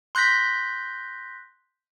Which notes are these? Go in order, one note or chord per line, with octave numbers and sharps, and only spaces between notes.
C6 F#6 G6 A#6 B6